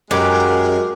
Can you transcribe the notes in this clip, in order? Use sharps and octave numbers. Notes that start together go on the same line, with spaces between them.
F#2 G#3 G4 A#4 D6